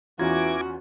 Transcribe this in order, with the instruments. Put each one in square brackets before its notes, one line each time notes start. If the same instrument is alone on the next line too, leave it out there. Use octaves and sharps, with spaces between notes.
[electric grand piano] E2 C#4 F4 [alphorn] E3 [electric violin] F#4 [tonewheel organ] A#5 D6 G#6